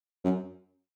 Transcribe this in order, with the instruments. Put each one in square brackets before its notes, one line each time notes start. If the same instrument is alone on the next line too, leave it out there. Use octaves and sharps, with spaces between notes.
[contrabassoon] F#2